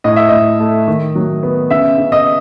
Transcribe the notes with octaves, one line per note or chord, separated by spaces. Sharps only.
A2 D#5
E5
A2 D#5
A3
D#3
F#3
B3
C#3 E5
C#3
D#5